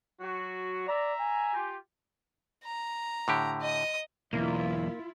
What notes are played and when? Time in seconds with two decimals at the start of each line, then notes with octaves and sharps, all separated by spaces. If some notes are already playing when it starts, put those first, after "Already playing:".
0.21 F#3 F#4
0.87 D5 E5 A#5
1.19 G#5
1.54 F4 G4
2.64 A#5
3.28 A2 D3 G4
3.61 D#5 D#6
4.33 B1 E2 A#3 E4 F4